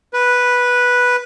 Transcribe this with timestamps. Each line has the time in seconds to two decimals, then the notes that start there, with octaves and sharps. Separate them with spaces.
0.14 B4